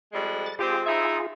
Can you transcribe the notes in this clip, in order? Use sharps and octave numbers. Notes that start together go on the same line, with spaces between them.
F2 G3 G#3
A6
G#3 C4 F4 G4 G#4
D#4 E4 E5